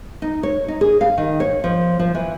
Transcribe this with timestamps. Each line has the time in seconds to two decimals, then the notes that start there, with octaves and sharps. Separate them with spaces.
0.22 D#4
0.43 C#5
0.68 D#4
0.81 G#4
1.01 F5
1.18 D#3
1.40 C#5
1.64 F3
1.99 F3
2.15 E3